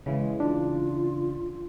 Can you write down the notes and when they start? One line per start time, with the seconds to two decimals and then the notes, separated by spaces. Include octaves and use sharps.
0.06 C#3 E3 G#3
0.40 D4 F4